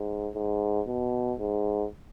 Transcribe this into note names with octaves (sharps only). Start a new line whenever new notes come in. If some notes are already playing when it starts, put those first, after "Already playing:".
Already playing: G#2
G#2
B2
G#2